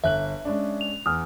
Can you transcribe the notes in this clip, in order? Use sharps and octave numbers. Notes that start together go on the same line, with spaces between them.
G1 E5 F#6 F#7
G#3 C#4 D4
F7
E2 D#6 F6